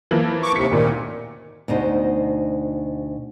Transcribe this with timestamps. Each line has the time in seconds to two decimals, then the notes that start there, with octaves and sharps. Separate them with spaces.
0.11 E3 F3 A#3
0.43 C#6 D6
0.56 D#2 C3 B6 C#7
0.71 D2 A#2 D#3
1.68 D2 B2 D#4 C5